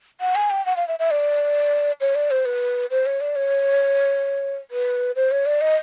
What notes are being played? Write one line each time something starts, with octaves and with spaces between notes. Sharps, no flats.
F#5
G#5
G5
F#5
F5
E5
E5
D5
C#5
D5
C5
B4
C5
C#5
D5
C#5
B4
C5
C#5
D5
D#5